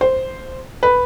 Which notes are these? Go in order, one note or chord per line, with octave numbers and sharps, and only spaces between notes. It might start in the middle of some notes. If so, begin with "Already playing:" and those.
C5
B4